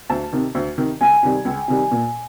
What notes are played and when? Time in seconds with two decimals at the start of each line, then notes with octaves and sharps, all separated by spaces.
0.10 D2 A5
0.33 C3 D#3
0.55 D2
0.78 C3 D#3
1.01 C#2 G#5
1.23 C3 D#3 G3
1.45 C#2
1.68 C3 D#3 G3
1.91 A#2